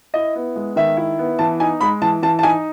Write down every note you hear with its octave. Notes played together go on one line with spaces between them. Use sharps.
E4 D#5
B3
G#3
D#3 E5
E4
B3
E3 A5
D#4 G#5
G#3 B5
E3 A5
E3 A5
A5
D#4 G#5